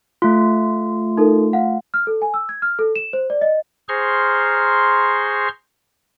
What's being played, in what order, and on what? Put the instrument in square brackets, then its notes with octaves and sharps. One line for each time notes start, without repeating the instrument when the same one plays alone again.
[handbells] A3 F4
[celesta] D#4 A4 A#4
F5 F#5
F6
A4
G#5
E6
G#6
F6
A4
E7
C5
D5
D#5
[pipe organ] G#4 C5 A#5 C6 C#6 F6